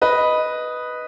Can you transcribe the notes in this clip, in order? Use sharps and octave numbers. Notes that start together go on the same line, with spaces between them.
B4 D#5